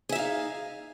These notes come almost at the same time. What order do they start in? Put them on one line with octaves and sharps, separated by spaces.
G#4 E5 D#4 F5